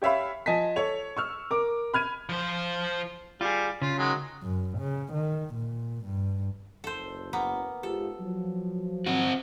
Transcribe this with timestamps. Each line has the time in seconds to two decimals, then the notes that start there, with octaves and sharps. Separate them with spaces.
0.02 G4 C#5 E5 F5 B5
0.46 F3 D#5 G#5 A5 B6
0.76 A4 C#5 F7
1.17 C#6 E6 F6
1.51 A#4 D6
1.94 B5 F6 G#6 D#7
2.29 F3 C5
3.41 G3 F4 G#4
3.82 C#3 F4
3.98 D#3 F#3 G#3
4.43 F#2
4.79 C#3
5.13 D#3
5.54 A#2
6.05 G2
6.84 F#1 A4 C5
7.33 A#3 B3
7.83 G#2 F4 G4 A4
8.21 F3 F#3
9.06 C4 F#4 D#5